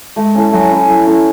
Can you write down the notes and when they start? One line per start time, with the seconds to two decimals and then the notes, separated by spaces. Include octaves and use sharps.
0.16 G#3 A3
0.35 C#4 E4 A4
0.52 F#3 A3
0.71 C#4 E4 A4
0.88 F#3 A3
1.06 C#4 E4 A4